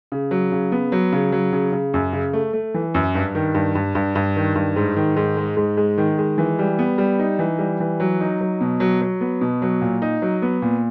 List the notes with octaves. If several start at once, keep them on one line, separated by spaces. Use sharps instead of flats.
C#3
F#3
C#3
B3
F#3
C#3
F#3
C#3
C#3
F#2
C#3
A3
A3
E3
F#2
G2
D#3
G2
G2
G2
G2
D#3
G2
G#2
D#3
G#2
G#3
G#2
G#3
D#3
G#3
E3
G3
B3
G3
D#4
E3
G3
E3
F#3
D#4
F#3
B2
F#3
F#3
B3
B2
F#3
A#2
D#4
F#3
B3
A#2